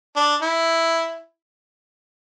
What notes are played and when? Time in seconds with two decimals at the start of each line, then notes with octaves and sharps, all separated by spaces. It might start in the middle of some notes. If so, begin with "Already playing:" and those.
0.16 D4
0.42 E4